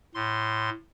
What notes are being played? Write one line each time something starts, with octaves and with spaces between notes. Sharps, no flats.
A2 C6